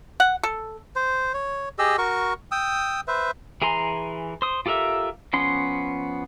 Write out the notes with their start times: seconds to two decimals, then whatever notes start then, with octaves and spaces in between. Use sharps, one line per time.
0.20 F#5
0.43 A4
0.96 C5
1.34 C#5
1.79 G4 G#4 D#5 E6
1.98 F#4 A#4 C#6
2.51 G5 D#6 E6
3.08 B4 C5 E5
3.62 E3 G#4 G#5 A#5 C6
4.42 C5 D#6
4.66 F4 G4 A4 A#4 E5
5.33 F3 B3 C#4 C6